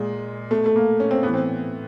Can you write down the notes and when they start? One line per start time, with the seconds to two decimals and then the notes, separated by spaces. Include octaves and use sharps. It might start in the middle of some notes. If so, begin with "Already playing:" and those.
Already playing: A#2 G#3
0.51 B2 A3
0.66 A3
0.76 A#3
1.00 C#4
1.11 C4
1.23 A2 E3 B3
1.34 C4